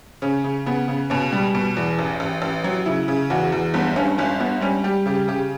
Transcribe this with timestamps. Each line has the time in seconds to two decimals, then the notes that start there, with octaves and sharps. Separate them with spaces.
0.22 C#3 C#4
0.44 C#3
0.66 C#3 B3
0.88 C#3
1.10 B2 C#4
1.33 G3
1.55 B2
1.77 E2
1.99 A1
2.20 A1
2.42 A1
2.64 F#3
2.86 C#3 E4
3.08 C#3
3.30 E2 F#4
3.52 E2
3.74 G1 B3
3.96 G2 C#4
4.18 G1 C#4
4.40 G1 B3
4.61 G3 C#4
4.84 G3 G4
5.06 C#3 G4
5.28 C#3 G4